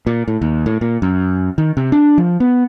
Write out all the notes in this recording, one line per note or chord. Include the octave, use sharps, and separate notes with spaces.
A#2
A2
D#2
A2
A#2
F#2
D#3
C3
D4
F3
B3